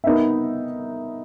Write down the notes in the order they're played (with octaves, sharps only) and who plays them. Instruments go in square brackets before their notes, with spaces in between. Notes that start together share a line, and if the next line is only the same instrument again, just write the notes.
[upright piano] B3 D#4 A#4 E5